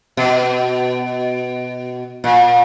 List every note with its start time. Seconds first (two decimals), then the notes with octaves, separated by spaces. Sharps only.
0.17 B2
2.24 A#2